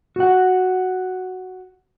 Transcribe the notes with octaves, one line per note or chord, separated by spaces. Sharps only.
F#4 F#5